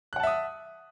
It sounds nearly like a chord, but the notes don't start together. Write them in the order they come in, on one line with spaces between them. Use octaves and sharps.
F#6 F#5 A5 E5 D#6